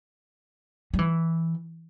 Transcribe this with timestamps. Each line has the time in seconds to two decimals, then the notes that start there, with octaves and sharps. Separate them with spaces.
0.94 G3
0.99 E3